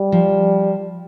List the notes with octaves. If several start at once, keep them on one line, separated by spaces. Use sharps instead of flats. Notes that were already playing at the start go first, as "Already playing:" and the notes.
Already playing: G3
F3